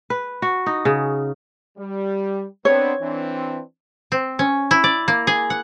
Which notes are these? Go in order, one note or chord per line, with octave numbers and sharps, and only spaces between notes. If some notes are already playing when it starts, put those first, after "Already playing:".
B4
F#4
D#4
C#3
G3
B3 C4 D4 C#5
E3 C4 D4
C4
C#4
E4
D5
A#3
G#4
F#5